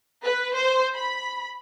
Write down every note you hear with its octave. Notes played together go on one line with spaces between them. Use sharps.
B4
C5
B5